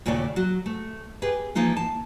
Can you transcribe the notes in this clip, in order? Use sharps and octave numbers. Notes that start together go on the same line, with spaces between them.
D#2 A#2 C#3 A3 D5 G5
F#3 F#4
A3
G4 G#4 B4
E3 F3 A#3 D#4 F4
A5